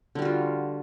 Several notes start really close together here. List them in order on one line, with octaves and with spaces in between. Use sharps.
D3 G3 F#4 F4